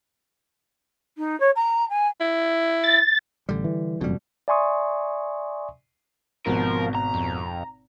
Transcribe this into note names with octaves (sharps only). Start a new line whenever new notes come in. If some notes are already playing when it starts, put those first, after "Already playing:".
D#4
C#5
A#5
G#5
E4
A6
A1 D3 G3
E3
F#1 F2 B2 G3
D5 E5 G#5 C6 C#6 D#6
G#1 B2 F3 A#4
A#5
F2